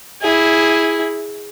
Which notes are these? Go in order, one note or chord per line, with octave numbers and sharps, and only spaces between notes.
E4 G#4